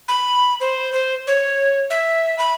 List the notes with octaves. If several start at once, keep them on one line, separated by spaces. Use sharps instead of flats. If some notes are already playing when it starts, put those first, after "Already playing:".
B5
C5
C5
C#5
E5
B5